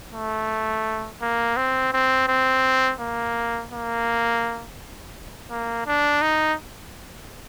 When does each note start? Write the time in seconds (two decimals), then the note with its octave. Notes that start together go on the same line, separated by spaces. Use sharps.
0.14 A3
1.22 A#3
1.57 C4
1.93 C4
2.28 C4
3.00 A#3
3.72 A#3
5.51 A#3
5.87 D4
6.22 D#4